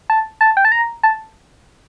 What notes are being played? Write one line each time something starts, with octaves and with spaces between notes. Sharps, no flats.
A5
A5
G5
A5
A#5
A5